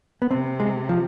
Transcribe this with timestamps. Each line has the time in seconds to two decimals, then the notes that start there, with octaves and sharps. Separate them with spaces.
0.22 B3
0.30 C3 C4
0.60 G#3
0.89 F3